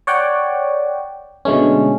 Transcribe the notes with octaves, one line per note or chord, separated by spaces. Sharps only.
C#5 D5 F#5 G5
B2 D3 G#3 A3 C#4